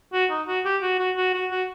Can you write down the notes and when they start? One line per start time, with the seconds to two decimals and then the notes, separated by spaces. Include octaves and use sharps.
0.13 F#4
0.30 D#4
0.48 F#4
0.65 G4
0.82 F#4
0.99 F#4
1.17 F#4
1.34 F#4
1.51 F#4